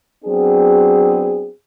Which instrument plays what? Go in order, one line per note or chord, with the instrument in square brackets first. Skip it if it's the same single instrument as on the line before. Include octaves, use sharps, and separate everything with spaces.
[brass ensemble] F#3 B3 C4 D4 F#4 G#4